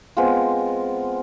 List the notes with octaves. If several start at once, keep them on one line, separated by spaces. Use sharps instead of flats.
G#3 B3 C4 F4